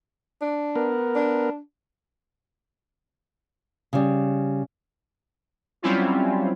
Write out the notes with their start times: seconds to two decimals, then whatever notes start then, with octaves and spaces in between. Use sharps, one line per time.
0.41 D4
0.76 B3 A#4
1.15 D4
3.93 C#3 G3
5.82 F#3 G3 C4 C#4 E4 F4